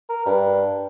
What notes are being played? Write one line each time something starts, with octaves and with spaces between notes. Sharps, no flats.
A#4
G2